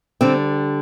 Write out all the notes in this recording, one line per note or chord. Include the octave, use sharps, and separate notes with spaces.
D3 G3 C4